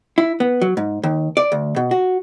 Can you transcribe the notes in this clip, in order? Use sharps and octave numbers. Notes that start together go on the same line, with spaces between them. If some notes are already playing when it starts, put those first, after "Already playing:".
E4
B3
F#3
G#2
D#2
D5
D2
B2
F#4